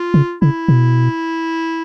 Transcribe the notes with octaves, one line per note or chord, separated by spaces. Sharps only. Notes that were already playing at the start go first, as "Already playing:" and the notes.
Already playing: F4
C#3
C#3 E4
B2